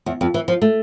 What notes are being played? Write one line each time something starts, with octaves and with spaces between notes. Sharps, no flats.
E2
F2
E3
F3
A3